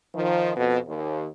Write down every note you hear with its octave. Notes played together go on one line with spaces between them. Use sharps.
D#3 F3
F2 B2
D#2